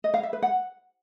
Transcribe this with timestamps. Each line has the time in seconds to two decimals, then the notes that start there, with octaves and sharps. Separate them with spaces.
0.04 D#5
0.14 F5
0.23 E5
0.33 B4
0.42 F#5